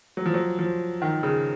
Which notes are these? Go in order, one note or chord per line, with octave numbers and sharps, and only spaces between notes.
F#3
F3
F#3
F3
D#3
C#3